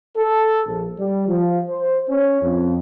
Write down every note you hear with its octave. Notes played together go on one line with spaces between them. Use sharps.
A4
A#1
G3
F3
C5
C#4
F2